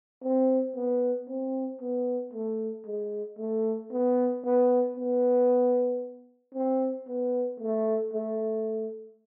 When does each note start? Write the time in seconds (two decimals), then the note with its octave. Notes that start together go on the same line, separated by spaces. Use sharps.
0.23 C4
0.76 B3
1.28 C4
1.81 B3
2.33 A3
2.86 G#3
3.39 A3
3.92 B3
4.44 B3
4.97 B3
6.54 C4
7.08 B3
7.60 A3
8.13 A3